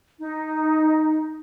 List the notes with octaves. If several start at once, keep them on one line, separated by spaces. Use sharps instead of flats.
D#4